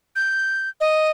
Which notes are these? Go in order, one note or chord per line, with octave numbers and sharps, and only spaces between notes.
G6
D#5